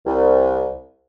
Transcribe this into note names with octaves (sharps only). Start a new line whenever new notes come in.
C2